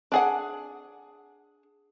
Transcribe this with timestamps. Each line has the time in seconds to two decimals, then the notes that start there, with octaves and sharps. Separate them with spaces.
0.12 D4 G#4 F#5